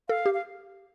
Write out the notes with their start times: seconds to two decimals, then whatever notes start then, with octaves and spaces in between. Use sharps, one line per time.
0.09 A4 F5
0.26 G4
0.34 F5